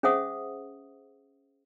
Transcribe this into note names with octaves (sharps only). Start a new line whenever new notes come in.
C#4 G#4 C5 E5 F#5 D#6